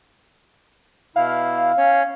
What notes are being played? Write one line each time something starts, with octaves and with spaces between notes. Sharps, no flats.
B2 E4 F5
C#4 C#5